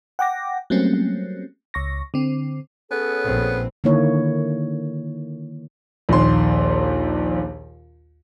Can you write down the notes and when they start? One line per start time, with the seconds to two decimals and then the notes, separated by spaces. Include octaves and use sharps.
0.19 F#5 G5 D6 A#6
0.70 F#3 G3 A3 A#3 C4 C#4
1.74 C#2 C#6 A#6
2.14 D3 C4
2.91 B3 C#4 G#4 A4
3.25 A#1 C4
3.84 D3 D#3 A#3 E4 C#5
6.09 A#1 D#2 C6